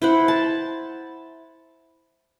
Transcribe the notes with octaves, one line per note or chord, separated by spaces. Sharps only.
E4 C5 F#5
A5